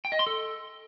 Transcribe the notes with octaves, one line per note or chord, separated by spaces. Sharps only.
G5
D#5
C6
A4